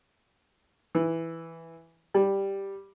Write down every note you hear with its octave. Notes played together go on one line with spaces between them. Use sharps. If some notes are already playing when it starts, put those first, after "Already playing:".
E3
G3